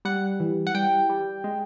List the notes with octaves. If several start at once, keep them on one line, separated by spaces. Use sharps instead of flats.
G3 F#5
E3
F#5
G3 G5
G3
G#3